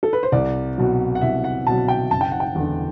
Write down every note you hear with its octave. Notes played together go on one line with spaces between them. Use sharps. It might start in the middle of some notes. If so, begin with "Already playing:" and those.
A4
B4
C5
C2 D5
B2 F#3
F#5
C2 E5
F#5
B2 F#3 A5
G5
F#1 A5
G5
F#5
G5
E2 D3